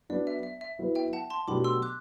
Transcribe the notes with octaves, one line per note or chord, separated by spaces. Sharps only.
F#3 B3 D4 D5
E5
E5
E5
F#3 B3 E4 B4
E5 G5
F#5 A5
A5 C6
B2 F#3 A3 D4 G4 B5 D6
C6 E6
D6 F#6